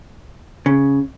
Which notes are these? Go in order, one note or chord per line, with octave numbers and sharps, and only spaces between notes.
C#3